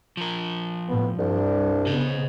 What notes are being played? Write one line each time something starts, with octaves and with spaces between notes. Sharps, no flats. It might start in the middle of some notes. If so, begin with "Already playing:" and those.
F3 A#4
A2 B3
C2 G2 D4
C#3 B3 C5 D#5